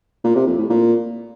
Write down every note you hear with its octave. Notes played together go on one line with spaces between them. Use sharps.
A#2
C3
F2
A2
A#2